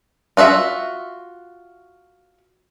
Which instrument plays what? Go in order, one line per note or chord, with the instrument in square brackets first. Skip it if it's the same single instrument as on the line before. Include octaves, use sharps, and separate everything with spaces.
[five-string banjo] F4 F#4 G#4 E5